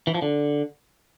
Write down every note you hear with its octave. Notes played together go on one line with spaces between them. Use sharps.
E3
F3
D3